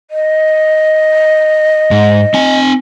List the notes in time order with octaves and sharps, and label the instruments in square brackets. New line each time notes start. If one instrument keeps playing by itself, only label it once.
[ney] D#5
[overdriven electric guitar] G#2
C4 G#5